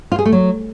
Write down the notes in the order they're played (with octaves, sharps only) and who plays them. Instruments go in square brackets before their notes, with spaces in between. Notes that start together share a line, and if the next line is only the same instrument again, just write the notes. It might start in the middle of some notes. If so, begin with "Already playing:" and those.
[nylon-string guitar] F4
G#4
A3
F#3